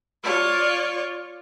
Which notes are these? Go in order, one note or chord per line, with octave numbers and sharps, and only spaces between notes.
F4 C#5 D5